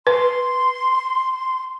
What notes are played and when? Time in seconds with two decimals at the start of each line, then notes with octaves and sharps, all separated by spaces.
0.07 B4 C6